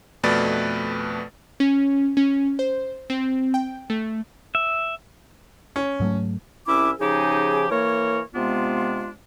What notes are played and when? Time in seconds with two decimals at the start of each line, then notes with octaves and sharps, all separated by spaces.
0.23 F2 B2 A3 B4 D5 A6
1.60 C#4
2.17 C#4
2.59 C5
3.10 C4
3.54 G5
3.90 A3
4.55 E5
5.76 C#4
6.00 G#2 F#3 A3
6.67 C2 C#4 E4 E5 D6
7.00 C#3 F3 D#4 G4 G#4
7.70 E3 A#3 A#4 C#5
8.34 C3 G#3 B3 D4 F4